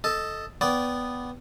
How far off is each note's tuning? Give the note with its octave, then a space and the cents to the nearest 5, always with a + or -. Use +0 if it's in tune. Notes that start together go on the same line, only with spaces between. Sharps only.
A4 +0 D#5 +0
B3 +0 D5 -20 G5 -5